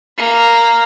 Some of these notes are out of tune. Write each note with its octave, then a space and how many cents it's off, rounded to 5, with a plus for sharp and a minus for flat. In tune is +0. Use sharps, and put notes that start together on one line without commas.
A#3 -5